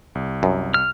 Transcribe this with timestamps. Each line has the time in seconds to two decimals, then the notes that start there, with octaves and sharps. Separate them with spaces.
0.15 C2
0.43 F#2
0.74 F6